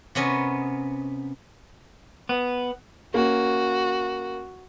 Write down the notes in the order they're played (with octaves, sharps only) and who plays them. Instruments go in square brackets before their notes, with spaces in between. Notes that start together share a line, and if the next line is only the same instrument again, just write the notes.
[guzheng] C3 B3 C#4 A#4 D#5
[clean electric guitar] B3
[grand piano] A#3 C#4 [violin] F#4